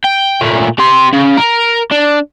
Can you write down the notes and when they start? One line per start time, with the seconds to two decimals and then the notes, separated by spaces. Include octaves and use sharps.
0.04 G5
0.41 A#2 A3
0.79 G4 C6
1.13 C#3
1.37 A#4
1.91 D4